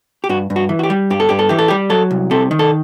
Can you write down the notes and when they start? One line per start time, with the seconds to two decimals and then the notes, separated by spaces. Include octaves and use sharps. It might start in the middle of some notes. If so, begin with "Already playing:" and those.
0.24 G4
0.29 G2 F#4
0.50 G2
0.56 F#4
0.69 E3
0.79 F#4
0.83 G4
0.90 G3
1.10 G2 G4
1.20 A4
1.29 G2 G4
1.39 A4
1.49 E3 G4
1.59 A4
1.68 G3 G4
1.90 F#3 A4
2.11 C2
2.31 C3 A4
2.51 D#3
2.59 A4